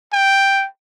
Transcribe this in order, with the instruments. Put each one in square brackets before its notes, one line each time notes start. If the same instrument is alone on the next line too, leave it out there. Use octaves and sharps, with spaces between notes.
[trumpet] G5